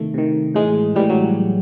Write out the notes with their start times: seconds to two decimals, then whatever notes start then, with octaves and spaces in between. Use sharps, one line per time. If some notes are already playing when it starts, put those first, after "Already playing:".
Already playing: C3 D#3 A3
0.14 C3 D#3
0.55 A2 E3 G#3
0.95 A2 E3 G3
1.10 F#3